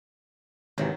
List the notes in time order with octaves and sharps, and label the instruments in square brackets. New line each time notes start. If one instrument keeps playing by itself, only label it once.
[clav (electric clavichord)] G#1 C3 E3 [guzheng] D#3 F#3